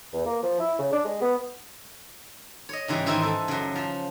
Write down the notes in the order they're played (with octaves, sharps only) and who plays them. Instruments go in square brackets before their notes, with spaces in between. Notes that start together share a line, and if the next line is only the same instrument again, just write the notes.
[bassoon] E2
A#3
F3
E4
C#3
D4
G#3
B3
[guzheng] C#5 D#5
G#2 C#3 E3 G3
G#2 D#3 E3 D#4 E4 C5
E4 A4
F#2 C#3
F3